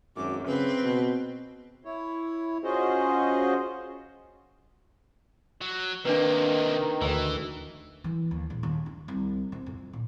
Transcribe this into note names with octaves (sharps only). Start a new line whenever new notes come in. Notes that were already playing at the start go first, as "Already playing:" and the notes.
G#1 F#2 D6
C#3 C4 B4
B2
E4 C#5
C#4 F4 F#4 G#4 C5 D#5
F#3
C3 D#3 A#3 D4 B4
D2 E3
E3
D#2
A#1
D#2
D4
C2
C3
F2
A#2